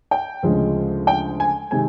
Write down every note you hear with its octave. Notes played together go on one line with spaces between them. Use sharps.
G5
D2 C#3 F3 G#3
G5
G#5
C3 D#3 G#3 C4 G#5